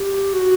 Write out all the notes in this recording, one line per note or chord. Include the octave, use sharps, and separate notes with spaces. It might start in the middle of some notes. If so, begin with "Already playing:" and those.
Already playing: G4
F#4